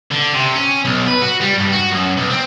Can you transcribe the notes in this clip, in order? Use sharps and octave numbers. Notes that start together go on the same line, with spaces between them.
D3
C3
C#4
B1
B4
F#4
G3
G2
F#4
F#2
B1
C4